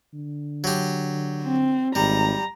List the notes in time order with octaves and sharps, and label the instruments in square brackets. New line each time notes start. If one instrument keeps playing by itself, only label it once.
[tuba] D3
[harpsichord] F#3 G4
[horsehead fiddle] C4
[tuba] G#1 [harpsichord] G3 [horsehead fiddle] A#5